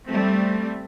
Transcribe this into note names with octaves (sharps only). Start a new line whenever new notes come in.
G3 A3 C4